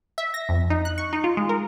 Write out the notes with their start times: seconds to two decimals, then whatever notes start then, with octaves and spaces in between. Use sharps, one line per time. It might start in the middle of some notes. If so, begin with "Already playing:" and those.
0.18 E5
0.34 A#6
0.49 F2
0.70 D#4
0.85 F#6
0.98 C#6
1.13 D#4
1.24 F4
1.37 G#3
1.49 A#4